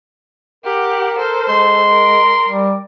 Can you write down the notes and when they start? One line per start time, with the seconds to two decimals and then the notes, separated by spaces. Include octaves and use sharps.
0.65 G4 A#4 F#5
1.19 A4 C5
1.49 G#3 C6
1.89 A#4
2.48 G3